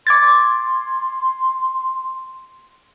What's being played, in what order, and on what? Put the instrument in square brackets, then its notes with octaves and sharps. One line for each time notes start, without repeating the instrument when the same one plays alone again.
[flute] C6 [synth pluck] D6 G#6 A6